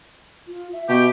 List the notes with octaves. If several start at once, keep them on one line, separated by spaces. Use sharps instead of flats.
F4
E5
B2 G4